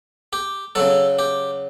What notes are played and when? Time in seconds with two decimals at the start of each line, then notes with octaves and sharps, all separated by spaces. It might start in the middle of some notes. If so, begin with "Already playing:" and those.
0.33 G4
0.75 C#3 F#3 A4
1.19 G4